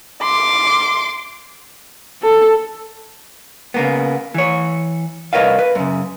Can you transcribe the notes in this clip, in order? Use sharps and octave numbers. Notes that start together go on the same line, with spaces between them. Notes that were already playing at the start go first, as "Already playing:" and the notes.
C6 D6
A4
C#3 A#3 B3
E3 C#5
C2 A#4 B4 C#5 D#5 F5
B4
F#2 C#3